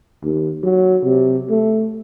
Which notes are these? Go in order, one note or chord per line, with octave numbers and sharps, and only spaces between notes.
D#2
F#3
C3
A3